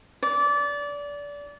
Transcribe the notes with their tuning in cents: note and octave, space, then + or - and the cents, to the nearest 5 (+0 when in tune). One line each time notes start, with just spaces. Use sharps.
D5 -25